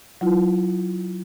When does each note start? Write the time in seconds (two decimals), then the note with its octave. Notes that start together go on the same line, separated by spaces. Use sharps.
0.21 F#3 E4 F4